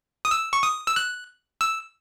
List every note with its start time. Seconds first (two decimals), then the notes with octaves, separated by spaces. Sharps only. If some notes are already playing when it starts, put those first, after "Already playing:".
0.25 D#6
0.31 E6
0.53 C#6
0.63 D#6
0.87 E6
0.96 F#6
1.61 E6